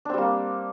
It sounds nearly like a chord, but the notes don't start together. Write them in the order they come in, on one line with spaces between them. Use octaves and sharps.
D4 C4 G3 A#3